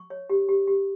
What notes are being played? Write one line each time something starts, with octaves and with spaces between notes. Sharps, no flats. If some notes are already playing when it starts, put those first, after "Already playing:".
Already playing: C#6
C#5
G4
G4
G4